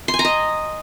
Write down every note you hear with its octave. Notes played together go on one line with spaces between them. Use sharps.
C6
G#5
A#5
D#5